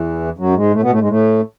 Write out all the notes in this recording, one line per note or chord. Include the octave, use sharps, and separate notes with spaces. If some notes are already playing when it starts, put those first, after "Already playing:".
Already playing: E2 E3
F#2 F#3
G#2 G#3
A2 A3
B2 B3
A2 A3
G#2 G#3
A2 A3